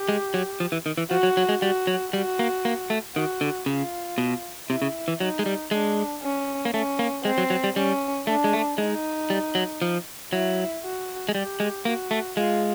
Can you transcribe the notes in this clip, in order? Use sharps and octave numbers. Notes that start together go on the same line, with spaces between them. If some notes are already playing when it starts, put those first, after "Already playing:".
Already playing: G4
G#3
F#3
F3
E3
D#3
E3
F3 F#4
F#3
F#3
G#3
G3 F#4
F#3
G3 F#4
A#3
A#3
A3
D#3 F#4
D3
C#3 F4
B2
C3 E4
C#3
E3
F#3 D#4
G#3
G3
G#3 D4
C#4
A#3
A3 C#4
A#3
G#3 C4
F#3
F#3
G3
G3 C#4
A3 D4
G#3
A3
G#3 D#4
G3
F#3
F3
F#3 E4
F#4
G#3
G3 G4
G#3
A#3 F#4
A3
G#3 F4